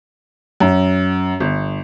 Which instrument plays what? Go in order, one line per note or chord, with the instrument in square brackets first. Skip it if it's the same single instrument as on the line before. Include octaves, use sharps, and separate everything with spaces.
[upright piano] F#2
G1